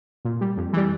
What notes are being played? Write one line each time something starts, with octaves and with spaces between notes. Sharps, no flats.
A#2
G3
F2
E3 G3